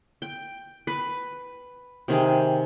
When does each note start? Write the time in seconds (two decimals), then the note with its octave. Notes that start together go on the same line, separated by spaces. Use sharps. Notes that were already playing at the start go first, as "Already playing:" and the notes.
0.22 G5
0.87 B4
2.08 C3 D#3 G#4